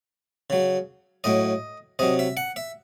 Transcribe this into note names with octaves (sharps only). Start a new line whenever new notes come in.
C#3 F#3
A2 F#3 D#5
C3 F#3 D#5
E5
F#5
E5